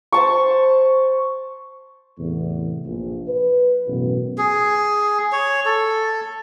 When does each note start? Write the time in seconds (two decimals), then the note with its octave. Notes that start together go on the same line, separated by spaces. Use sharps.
0.12 C5 A5 C#6
2.19 E2 A2 C3
2.86 A#1
3.28 B4
3.87 A1 F#2 B2
4.38 G#4
5.32 C#5
5.66 A4